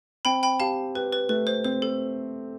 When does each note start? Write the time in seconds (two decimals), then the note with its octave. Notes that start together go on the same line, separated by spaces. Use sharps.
0.25 C4 G5 B5
0.43 G5 B5
0.60 G4 F5 A5
0.95 G4 B4
1.13 B4
1.29 A3 B4
1.47 C5
1.65 C4 C5
1.82 A4